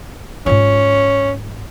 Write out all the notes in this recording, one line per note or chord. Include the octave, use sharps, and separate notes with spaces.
G#2 C#4 F4